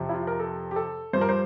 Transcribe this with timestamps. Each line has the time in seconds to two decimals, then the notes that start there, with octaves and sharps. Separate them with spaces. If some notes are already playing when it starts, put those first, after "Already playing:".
Already playing: F2 C3 F3
0.09 E4
0.14 F4
0.27 A#4
0.40 A4
0.71 G4
0.76 A4
1.13 G2 F3 C5
1.21 A#4
1.29 C5